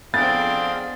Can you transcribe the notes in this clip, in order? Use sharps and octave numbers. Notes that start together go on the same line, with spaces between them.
F2 B3 C4 D4 G#4 F5 A6